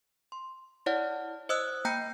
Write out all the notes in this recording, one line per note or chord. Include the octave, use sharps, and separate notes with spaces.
C6
E4 C#5 D5 F#5 F6
C5 D#5 D#6 E6 F#6
A#3 G5 A#5 G6 A#6 C#7